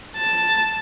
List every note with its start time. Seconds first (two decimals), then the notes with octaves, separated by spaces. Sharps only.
0.17 A5